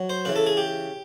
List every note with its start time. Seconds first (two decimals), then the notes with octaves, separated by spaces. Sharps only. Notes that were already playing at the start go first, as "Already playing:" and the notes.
Already playing: F#3
0.10 C5
0.25 C#3 E3 B4
0.36 A4
0.46 G#4
0.57 G4